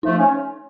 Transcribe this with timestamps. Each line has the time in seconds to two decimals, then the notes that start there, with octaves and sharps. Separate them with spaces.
0.03 F3 A3 D#4
0.17 C#4